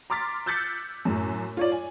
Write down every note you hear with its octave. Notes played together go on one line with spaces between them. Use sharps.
A#5 C6 D6 F6 A6 B6
E6 F#6 G6 A6 B6 C#7
F#2 A2
F4 C#5 D5
G#5